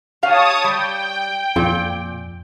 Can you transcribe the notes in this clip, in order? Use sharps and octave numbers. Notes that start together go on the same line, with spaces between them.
G4 C#5 F5 A5 D#6
G3 G5
F2 A#2